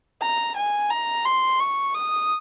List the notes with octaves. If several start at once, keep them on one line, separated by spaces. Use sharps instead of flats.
A#5
G#5
A#5
C6
C#6
D#6